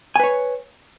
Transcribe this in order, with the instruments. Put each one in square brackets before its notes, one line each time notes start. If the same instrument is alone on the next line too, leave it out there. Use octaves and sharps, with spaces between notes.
[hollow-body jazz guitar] G#5
B4
C#5